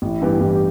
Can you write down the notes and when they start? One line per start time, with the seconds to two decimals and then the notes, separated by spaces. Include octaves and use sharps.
0.02 A1 E4
0.22 G2 E3 B3 G4
0.41 A1 G4